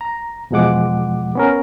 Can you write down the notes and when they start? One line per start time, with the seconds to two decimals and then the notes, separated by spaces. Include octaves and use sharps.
0.01 A#5
0.51 E2 B2 F3 G#3 F#5 D6
1.35 B3 C#4 A#4